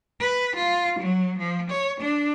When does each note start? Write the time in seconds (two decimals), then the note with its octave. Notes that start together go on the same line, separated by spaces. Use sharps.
0.20 B4
0.56 F4
0.99 F#3
1.38 F3
1.70 C#5
2.00 D4